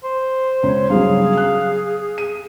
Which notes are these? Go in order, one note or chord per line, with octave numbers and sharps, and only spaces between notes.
C5
C#2 C#5
G2 C#3 F#3 G#4 F5
F#6
D#7